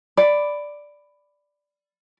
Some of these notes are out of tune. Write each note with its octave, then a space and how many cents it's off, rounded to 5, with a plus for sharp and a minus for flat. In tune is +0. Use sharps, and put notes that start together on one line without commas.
D5 +0 B5 +10